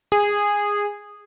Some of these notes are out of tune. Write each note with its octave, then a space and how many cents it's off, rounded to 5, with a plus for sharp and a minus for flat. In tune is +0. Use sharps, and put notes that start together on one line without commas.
G#4 -15